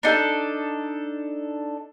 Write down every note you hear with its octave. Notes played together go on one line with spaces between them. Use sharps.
D4 D#4 A4